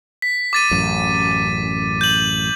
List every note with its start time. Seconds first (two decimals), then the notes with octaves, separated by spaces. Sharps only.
0.22 B6
0.53 D6 A6 D#7
0.71 A1 F#2
2.01 G6 F#7